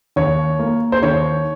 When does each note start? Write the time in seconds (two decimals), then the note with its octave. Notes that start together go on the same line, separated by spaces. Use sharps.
0.16 D#2 C#5
0.59 A#3
0.92 C5
1.03 D#2 C#5